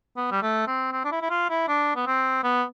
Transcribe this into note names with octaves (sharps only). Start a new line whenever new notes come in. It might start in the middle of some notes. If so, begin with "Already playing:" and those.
B3
G3
A3
C4
C4
D4
E4
E4
F4
E4
D4
B3
C4
B3